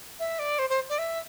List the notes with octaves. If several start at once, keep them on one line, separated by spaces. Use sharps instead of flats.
E5
D5
C5
C5
D5
E5